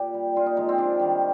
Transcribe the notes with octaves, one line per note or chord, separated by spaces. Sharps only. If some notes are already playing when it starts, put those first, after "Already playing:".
Already playing: A#2 G4
G3
A#2 F4
D#4
F3 G#3 D#4
C4
C3 D4
D#3 G3